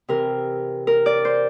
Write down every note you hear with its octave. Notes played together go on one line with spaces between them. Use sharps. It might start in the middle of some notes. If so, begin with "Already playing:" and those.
C3 E3 A#4
A#4
D5
C5